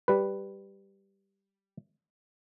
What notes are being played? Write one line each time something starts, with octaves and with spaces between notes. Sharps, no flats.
G3 B4